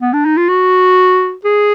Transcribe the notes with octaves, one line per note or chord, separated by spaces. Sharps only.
B3
D4
D#4
F4
F#4
G#4